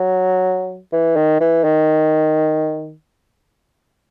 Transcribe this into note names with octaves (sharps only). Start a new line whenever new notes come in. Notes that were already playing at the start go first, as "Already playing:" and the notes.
Already playing: F#3
E3
D#3
E3
D#3